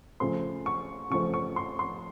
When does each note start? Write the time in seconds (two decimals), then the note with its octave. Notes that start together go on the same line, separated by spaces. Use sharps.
0.20 C#3 F3 A3 C4 C6
0.66 C#6
1.10 C#3 F3 A3 C4 C#6
1.34 C#6
1.56 C6
1.79 C6